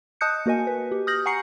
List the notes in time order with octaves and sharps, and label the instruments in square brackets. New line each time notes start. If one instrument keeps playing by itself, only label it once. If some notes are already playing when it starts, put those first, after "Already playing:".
[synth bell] D#5 A5 D#6 F#6 G6 C#7
A#3 F#4 A#4 D#5 G#5
B4
G4
D#6 F6 G6 A#6 F#7
F#5 G#5 A#5 C#6 C7 C#7